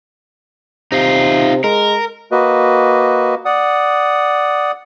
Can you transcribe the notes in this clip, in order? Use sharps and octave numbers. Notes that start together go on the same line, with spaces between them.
C3 D#4 F4
G#3 A#4
A#3 F#4 B4 D#5
D5 F#5 D#6